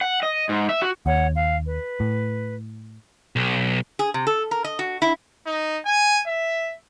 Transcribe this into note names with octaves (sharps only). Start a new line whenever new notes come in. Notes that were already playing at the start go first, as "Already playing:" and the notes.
F#5
D#5
G#2
E5
F#4
D#2 C#5 F#5
F5
B4
A2
B1
G#4
C3
A4
A#4
D#5
F#4
E4
D#4
G#5
E5